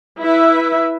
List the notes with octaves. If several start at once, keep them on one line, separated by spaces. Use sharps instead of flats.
E4 B4 E5